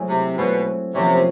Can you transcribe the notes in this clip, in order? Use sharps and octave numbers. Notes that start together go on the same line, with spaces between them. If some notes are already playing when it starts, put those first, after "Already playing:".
Already playing: F#3 A3 C4 E4 G#4
C3
B2 F#3 A3 C4 E4 G#4
C3 F3 A#3 C#4